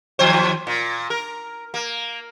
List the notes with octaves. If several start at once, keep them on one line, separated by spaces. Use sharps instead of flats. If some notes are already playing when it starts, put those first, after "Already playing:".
D#2 F3 C5
A#2
A#4
A#3